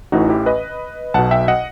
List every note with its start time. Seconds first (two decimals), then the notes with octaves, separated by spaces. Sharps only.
0.12 A1 A2 E3 D#4 F#4
0.29 E4 G4
0.46 B4 D#5
1.14 B1 B2 F#5 A5
1.31 E5 G5
1.48 D#5 F#5